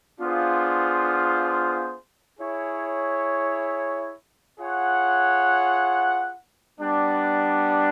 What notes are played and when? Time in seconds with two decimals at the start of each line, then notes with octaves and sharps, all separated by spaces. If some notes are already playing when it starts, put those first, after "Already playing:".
0.19 B3 D4 F4 G#4 C5
2.39 E4 G#4 C#5
4.58 F4 G#4 C#5 F#5
6.78 G3 B3 D4